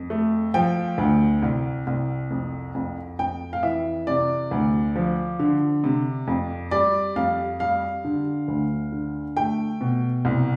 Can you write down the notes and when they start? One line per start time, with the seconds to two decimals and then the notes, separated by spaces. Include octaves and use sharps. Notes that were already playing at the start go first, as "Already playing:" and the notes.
Already playing: F2
0.10 A3
0.54 F3 G5
0.98 D2
1.43 C2
1.87 C2
2.31 F2
2.75 F2
3.19 F2 G5
3.53 F5
3.63 E3 E5
4.07 C3 D5
4.51 D2
4.96 F3
5.39 D3
5.84 C3
6.27 F2
6.71 G3 D5
7.16 F2 F5
7.60 G3 F5
8.04 D3
8.48 D2
8.92 D3
9.37 A3 G5
9.81 B2
10.25 C2